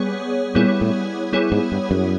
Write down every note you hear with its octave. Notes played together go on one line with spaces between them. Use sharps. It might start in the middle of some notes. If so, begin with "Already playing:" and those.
Already playing: G3 B3 G#4 C#5
A#2 G3 B3 E4 G#4 C#5
A2
G3 B3 E4 G#4 C#5
G#2
G2
F#2